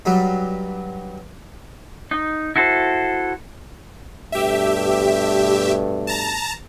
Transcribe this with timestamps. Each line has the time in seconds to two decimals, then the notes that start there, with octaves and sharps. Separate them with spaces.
0.05 G2 F#3 G3
2.11 D#4
2.56 E4 F#4 A4 C5
4.32 G2 B2 A3 G4 E5
6.07 A5 A#5